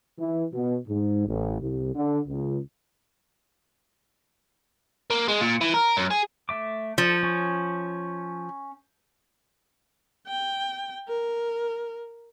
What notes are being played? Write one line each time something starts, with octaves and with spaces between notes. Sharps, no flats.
E3
B2
G#2
A1
C2
D3
C#2
A#3
G#3
A#2
E3
A#4
F#2
G#4
A3 E5 D6
F3 A4
C#4 C#5
G5
A#4